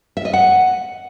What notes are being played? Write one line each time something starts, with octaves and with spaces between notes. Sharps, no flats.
E5
D#5
F#5